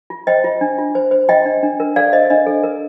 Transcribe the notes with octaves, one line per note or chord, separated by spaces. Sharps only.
F4
C5 D#5 G5
F4
D4
F4
C5
C5
F4 D#5 G5
D4
D4
A#4
A4 D5 F5
C5 D#5
D4 D#5
A4
A#4